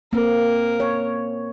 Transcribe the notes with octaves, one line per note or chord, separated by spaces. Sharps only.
A#3 C4 A#4
C#5